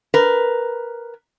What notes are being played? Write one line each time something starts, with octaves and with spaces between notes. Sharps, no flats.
A#4 B4